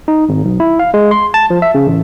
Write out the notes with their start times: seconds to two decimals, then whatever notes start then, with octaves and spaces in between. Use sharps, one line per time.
0.08 D#4
0.29 G#1
0.45 B1
0.60 E4
0.79 F5
0.94 G#3
1.11 C6
1.34 A5
1.50 F3
1.62 E5
1.75 C#3
1.87 A1